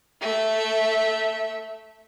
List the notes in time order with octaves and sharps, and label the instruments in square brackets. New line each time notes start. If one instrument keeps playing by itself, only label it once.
[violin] A3 E5